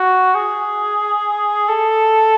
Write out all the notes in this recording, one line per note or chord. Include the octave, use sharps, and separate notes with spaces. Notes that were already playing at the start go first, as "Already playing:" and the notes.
Already playing: F#4
G#4
A4